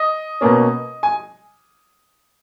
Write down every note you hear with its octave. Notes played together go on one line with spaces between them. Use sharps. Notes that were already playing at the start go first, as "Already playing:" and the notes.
Already playing: D#5
B2 A#3 C#4
G#5